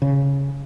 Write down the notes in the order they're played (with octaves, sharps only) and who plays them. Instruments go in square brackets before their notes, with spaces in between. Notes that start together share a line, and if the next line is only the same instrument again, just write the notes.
[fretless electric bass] C#3